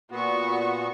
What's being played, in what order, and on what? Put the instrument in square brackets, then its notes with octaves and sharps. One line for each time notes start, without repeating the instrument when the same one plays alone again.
[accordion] A#2 B3 [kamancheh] F#4 C#6